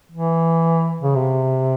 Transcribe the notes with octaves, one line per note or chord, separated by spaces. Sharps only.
E3
C#3
C3